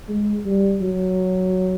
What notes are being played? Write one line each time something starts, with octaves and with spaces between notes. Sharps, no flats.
G#3
G3
F#3